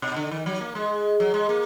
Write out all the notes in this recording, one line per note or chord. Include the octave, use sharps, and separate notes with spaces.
B2
D3
D#3
F#3
A#3
G#3
F#3
G#3
A#3